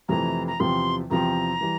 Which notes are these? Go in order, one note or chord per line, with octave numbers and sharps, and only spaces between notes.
F2 C3 E3 A3 E4 A#5
A#5
E2 C3 F3 C4 G4 C6
E2 C3 F3 C4 G4 A#5
E3 G3